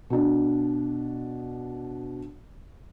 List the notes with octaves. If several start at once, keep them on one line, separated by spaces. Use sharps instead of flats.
B2 D4